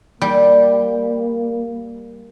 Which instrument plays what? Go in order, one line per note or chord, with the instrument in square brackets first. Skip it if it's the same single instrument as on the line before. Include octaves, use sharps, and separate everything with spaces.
[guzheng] G3 [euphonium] A#3